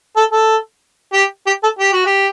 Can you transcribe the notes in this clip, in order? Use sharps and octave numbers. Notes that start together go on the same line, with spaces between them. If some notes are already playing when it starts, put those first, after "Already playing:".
A4
A4
G4
G4
A4
G4
F#4
G4